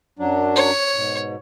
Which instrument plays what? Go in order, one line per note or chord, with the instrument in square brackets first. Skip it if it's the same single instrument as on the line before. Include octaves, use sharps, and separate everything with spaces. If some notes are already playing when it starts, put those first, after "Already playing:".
[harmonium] F#2 F#3 D4
[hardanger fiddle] C#5
[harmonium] G#2 B2